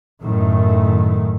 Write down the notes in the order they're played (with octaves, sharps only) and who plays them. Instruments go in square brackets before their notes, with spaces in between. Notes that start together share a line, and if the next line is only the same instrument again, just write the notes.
[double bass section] F#2 A2 D#3 A3